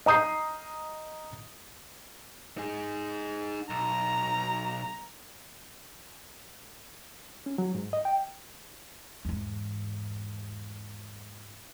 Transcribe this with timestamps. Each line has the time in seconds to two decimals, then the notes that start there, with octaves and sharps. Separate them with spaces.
0.06 D#5 A#5 D#6 G6 C7
2.58 D#4 G#4
3.70 B1 A#5
7.46 C#4
7.58 F#3
7.75 G#2
7.93 D#5
8.05 G5
9.25 E2 G#2